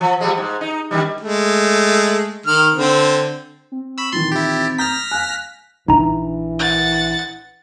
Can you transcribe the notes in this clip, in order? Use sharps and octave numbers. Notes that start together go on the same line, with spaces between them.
F3
F3 G3 G#3
G#2
D#4
F#2 D#3 G3
G#3 A3
D#3 F6
D3 C4
C4
B5 C#6 E6
A#2 D#3 E3 C6 A6
E4 G4
A#5 D#6 F6 G6 A#6 B6
F5 G#5 F#6
A#1 E3 D4 D#4 A#5
F#5 A6